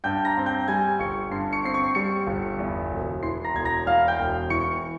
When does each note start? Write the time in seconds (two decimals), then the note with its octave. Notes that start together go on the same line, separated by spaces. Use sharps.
0.04 G2 G5 G6
0.25 A#5 A#6
0.37 C4
0.46 G5 G6
0.68 G3 G#5 G#6
0.99 G1 C#6 C#7
1.31 G2 C6 C7
1.53 C#6 C#7
1.64 C4 C7
1.74 C#6 C#7
1.95 G3 C#6 C#7
2.27 G1
2.59 E2
2.92 E1
3.23 E3 C6 C7
3.44 A#5 A#6
3.55 E1 G#6
3.65 A#5 A#6
3.86 E2 F5 F6
4.08 G5 G6
4.19 E1
4.50 E3 C#6 C#7